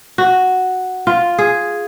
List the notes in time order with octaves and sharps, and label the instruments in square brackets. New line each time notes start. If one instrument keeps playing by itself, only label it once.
[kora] F#4
F4
G#4